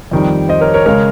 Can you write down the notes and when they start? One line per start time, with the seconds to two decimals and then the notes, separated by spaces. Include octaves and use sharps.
0.11 F2 D#3 G3
0.49 C5 D#5
0.61 A#4 C#5
0.74 A#4 C#5
0.86 C#3 G#3 A#4 C#5